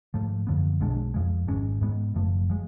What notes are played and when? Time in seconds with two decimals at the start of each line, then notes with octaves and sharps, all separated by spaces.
0.14 G#2 F3 A3
0.47 F#2 D3 F3 B3
0.80 B1 B2 G#3 D4
1.14 F2 F3 G#3
1.48 G#1 G#2 G#3 C#4
1.81 G#2 G#3 B3
2.14 F#1 F#2 F3 A3
2.50 F3 G#3